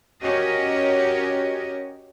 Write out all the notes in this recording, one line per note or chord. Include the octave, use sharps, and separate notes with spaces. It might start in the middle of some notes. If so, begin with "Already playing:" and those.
C#4 F#4 G4 A#4 C#5 D#5